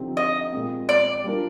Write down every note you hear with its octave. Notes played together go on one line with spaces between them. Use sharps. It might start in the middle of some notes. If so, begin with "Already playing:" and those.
Already playing: D3 F3 C4 D#4 G4
D#5
A#2 G#3 C4
D5
G3 A#3 D4 F4 A#4